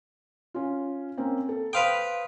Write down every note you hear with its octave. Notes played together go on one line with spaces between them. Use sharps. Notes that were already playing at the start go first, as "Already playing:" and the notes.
C#4 F4
A#3 C4 C#4
A4
B4 C5 F5 G5 C6 D#6